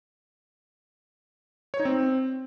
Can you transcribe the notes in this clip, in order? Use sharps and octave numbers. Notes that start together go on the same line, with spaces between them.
C#5
D#4
C4